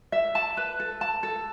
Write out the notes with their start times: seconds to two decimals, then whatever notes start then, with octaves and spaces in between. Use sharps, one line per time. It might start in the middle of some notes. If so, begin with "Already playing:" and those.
0.12 E5
0.35 A5
0.57 B4
0.80 A4
1.01 A5
1.23 A4